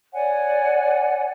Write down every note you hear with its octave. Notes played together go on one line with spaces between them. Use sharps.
C#5 D5 F#5 G#5